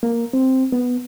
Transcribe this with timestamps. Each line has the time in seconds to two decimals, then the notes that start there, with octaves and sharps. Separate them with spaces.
0.03 A#3
0.33 C4
0.72 B3